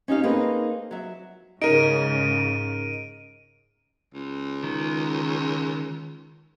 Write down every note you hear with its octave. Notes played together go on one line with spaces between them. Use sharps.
C#4 D#4 G4 F5
A#3 C4 D#4 G#4 A#4 B4
F#3 E5
G#2 C#3 D#4 A#4 D7 D#7
C#2
D#3